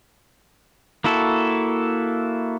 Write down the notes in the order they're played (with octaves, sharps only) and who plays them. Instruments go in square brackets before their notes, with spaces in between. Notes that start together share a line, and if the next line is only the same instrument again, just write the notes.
[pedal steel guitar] A#3 E4 F#4 A4